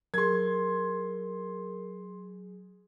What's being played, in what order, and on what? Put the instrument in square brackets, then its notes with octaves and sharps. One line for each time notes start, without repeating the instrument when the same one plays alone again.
[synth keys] F#3 G#4 [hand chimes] A#4 [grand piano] C6 G#6